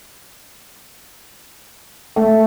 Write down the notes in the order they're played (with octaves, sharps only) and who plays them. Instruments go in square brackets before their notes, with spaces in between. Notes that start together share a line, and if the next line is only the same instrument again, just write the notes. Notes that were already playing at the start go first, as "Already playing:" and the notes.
[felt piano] A3